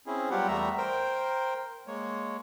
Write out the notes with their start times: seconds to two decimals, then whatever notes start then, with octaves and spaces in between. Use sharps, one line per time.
0.07 C4 C#4 E4 G#4
0.31 F#3 G3 B3 F4 G4 F#5
0.48 E2 G3 A3 B3 E5 A#5
0.78 A#4 C5 G5
1.87 G#3 A#3 C#5